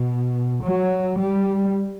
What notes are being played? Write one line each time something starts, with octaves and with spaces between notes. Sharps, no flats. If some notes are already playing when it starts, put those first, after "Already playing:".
Already playing: B2
F#3
G3